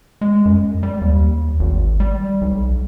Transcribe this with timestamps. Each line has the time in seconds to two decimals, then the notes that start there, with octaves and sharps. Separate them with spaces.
0.21 G#3
0.45 F#2
0.83 G3
1.01 D#2
1.59 G#1
2.00 G3
2.41 B1